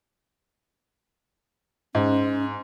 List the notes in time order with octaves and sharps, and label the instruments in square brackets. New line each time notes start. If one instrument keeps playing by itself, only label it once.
[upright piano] G#2 [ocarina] C#4